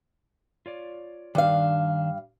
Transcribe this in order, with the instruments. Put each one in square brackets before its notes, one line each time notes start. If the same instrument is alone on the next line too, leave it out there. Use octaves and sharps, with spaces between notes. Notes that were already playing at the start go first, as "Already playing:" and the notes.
[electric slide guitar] F4 C#5 D5
[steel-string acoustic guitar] G2 F5 [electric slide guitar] D#3 D4